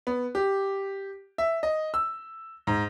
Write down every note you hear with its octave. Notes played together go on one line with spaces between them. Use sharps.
B3
G4
E5
D#5
E6
G#2